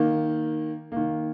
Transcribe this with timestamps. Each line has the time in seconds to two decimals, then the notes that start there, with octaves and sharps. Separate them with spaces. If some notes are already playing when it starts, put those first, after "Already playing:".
Already playing: D#3 A#3
0.92 D#3 A#3